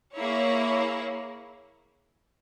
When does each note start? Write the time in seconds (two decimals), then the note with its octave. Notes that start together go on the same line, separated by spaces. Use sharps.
0.17 A#3 E4 G#4 C#5